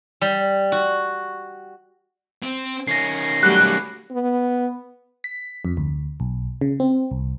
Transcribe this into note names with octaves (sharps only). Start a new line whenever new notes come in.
G3
F#4
C4
D#3 C#4 A#6 C7
F#3 G3 A3 F#6
B3
B6
F2
D2
B1
C#3
C4
C2